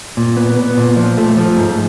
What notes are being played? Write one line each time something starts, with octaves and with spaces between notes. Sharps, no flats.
A#2
B3
B3
A#2
F3
A3
F3
G#2